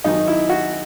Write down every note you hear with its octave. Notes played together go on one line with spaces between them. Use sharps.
G#1 F#2 D#3 D#4
E4
F#4